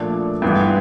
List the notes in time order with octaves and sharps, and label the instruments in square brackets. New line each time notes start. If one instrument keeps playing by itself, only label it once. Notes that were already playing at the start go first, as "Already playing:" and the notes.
Already playing: [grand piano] A#2 F3 A3 D4
G2 E3 G#3 B3